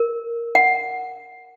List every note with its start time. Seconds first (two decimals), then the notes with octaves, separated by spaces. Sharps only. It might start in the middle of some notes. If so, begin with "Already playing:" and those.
Already playing: A#4
0.55 F#5